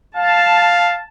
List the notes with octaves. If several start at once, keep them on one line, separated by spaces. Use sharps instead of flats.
F5 A5